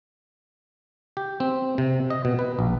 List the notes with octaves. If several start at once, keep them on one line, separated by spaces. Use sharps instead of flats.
G4
C4
C3
D#5
B2
B4
A#1